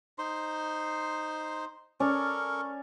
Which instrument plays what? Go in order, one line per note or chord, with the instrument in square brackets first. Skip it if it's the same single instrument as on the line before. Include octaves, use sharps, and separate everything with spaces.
[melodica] D#4 C5 C6
[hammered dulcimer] C#4 D5 [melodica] A4 A#4 C#6